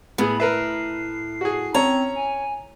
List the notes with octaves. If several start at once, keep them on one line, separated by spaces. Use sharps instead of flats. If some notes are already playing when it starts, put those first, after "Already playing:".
A2 B3 G#4 B5
A#4 B4 E5 C7
F#4 G#4
C4 C#4 C#5 A5 A#5
G#5